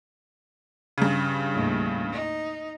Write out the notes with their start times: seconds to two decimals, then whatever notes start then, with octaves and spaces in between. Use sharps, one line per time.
0.98 G2 C#3
1.52 D#2 A2
2.12 D#4